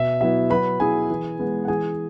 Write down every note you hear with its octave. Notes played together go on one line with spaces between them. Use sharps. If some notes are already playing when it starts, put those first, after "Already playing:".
Already playing: B2 E5
F#3 B3 E4 E5
F#3 B4 B5
B3 E4 G#4 G#5
E3
G#3 B3
F#5
E3 G#4 G#5